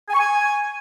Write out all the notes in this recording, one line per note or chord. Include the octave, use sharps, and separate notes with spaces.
G#5
C#6
G#5